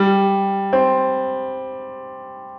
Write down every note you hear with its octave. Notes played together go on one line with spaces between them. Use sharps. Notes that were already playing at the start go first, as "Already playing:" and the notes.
Already playing: G3
C4